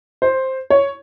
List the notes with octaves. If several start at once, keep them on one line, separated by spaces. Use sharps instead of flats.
C5
C#5